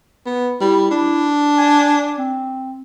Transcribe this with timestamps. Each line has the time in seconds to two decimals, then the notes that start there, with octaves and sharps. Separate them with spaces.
0.26 B3
0.61 G3 E4
0.91 D4
1.58 G#5
2.18 C4